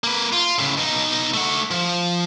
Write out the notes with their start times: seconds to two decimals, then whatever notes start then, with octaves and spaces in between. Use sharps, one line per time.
0.04 A#3 B4
0.32 F4
0.59 A2 C#3
0.77 B2 D#4
1.34 A3 F#5
1.71 F3